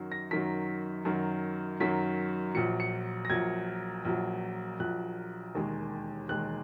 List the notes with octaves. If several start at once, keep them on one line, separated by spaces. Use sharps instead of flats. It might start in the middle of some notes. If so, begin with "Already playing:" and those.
Already playing: F#2 D#3 F#3
A#6
F#2 D#3 F#3 B6
F#2 D#3 F#3
F#2 D#3 F#3 B6
A#1 A#2 F#3 C#7
C#7
A#6
A#1 A#2 F#3 G#6
A#1 A#2 F#3
A#1 A#2 F#3 F#6
E1 D#2 D#3 G#3
E1 D#2 D#3 G#3 F#6